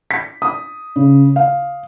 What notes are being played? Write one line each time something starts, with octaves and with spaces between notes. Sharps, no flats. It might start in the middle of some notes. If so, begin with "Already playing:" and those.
B6
D#6
C#3
F5